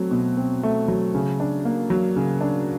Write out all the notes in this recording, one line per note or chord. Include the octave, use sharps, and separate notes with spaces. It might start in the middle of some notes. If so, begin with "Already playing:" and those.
Already playing: F#3 A3 C4
B2
C4
A3
F#3
C#3
D4
A#3
F#3
C#3
D4